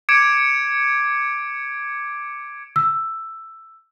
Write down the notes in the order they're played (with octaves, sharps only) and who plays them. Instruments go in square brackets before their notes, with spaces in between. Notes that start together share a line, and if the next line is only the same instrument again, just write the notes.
[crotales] D6 G#6 C#7 D7 E7
[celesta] E6